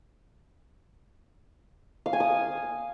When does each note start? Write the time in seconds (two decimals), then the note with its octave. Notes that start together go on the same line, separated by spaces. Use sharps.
2.06 F5
2.13 G#5
2.20 D#6